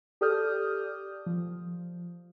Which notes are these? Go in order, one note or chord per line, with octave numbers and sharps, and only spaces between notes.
G4 A4 D5 D#6 F6 G6
F3